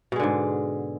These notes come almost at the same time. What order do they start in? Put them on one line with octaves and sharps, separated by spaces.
B2 G#3 D3 G#2